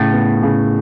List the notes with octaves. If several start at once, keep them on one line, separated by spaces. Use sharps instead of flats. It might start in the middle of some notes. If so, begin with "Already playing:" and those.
Already playing: A2 C#3
B3
C#3